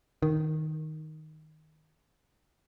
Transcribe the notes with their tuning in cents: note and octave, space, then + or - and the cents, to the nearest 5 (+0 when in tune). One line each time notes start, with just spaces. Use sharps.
D#3 +0